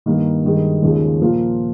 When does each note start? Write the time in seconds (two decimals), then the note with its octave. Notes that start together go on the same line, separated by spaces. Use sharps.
0.06 G2 D#3 A#3
0.44 G2 D#3 G#3
0.82 D#2 C#3 F3 G#3
1.21 A#2 F3 A#3 F4